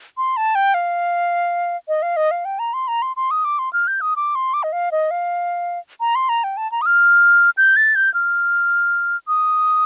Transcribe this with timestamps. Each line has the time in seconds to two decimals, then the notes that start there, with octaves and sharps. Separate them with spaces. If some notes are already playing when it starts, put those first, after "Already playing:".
0.17 C6
0.37 A5
0.55 G5
0.74 F5
1.88 D#5
2.02 F5
2.17 D#5
2.31 F5
2.45 G5
2.59 A#5
2.74 C6
2.88 A#5
3.02 C6
3.16 C6
3.31 D#6
3.45 D6
3.59 C6
3.73 F6
3.87 G6
4.01 D#6
4.16 D6
4.35 C6
4.54 D6
4.63 D#5
4.73 F5
4.92 D#5
5.11 F5
6.00 A#5
6.15 C6
6.29 A#5
6.44 G5
6.57 A5
6.72 A#5
6.82 D#6
6.86 F6
7.57 G6
7.76 A6
7.95 G6
8.14 F6
9.28 D#6